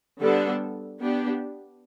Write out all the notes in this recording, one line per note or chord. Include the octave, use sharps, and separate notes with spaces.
D3 G3 B3 D4 A4
B3 D4 G4